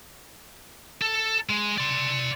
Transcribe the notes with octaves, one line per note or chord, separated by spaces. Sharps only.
A4
G#3
D5 C6